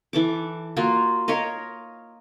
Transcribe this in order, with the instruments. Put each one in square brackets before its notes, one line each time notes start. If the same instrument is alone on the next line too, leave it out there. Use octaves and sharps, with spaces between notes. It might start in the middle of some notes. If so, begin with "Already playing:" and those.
[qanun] E3 A4 D6
A#3 F4 F#4
A#4 C#5 D#5 F5